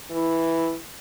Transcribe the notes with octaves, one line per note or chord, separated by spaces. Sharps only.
E3 E4